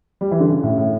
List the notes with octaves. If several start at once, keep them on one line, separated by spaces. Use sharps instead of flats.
G3
E3
D3
C#3
A2
A2